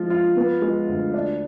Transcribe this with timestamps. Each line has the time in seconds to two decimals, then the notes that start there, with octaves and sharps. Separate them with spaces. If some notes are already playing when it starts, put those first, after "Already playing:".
Already playing: F3 G#3 F4
0.10 F4
0.37 B3
0.62 G#3
0.88 D2
1.14 D4